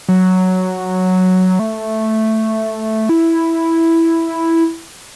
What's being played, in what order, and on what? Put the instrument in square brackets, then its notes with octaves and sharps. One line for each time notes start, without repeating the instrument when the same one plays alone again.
[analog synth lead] F#3
A3
E4